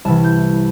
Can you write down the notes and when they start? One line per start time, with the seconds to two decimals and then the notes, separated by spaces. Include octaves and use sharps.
0.05 C2 C3 E3 A5
0.24 G6